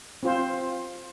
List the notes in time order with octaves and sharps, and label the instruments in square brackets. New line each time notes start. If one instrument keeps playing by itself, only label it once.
[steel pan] C4 F4 C5